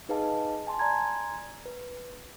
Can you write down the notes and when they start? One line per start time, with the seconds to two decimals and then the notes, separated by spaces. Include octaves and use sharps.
0.09 D#4 G#4 B4 D#5 F5 A5
0.67 G#5 A5 C6
0.79 D5 G#5 A#5 C6 G#6
1.65 B4